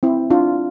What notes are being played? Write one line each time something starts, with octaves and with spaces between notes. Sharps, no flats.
C4 E4
D4 F4